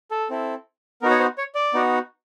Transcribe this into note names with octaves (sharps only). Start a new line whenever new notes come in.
A4
C4 E4 A4
B3 D#4 F#4 A#4
C#5
C5
C#5
D5
B3 D#4 F#4